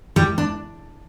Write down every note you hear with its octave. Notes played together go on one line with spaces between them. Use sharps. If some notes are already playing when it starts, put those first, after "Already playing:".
G3
D4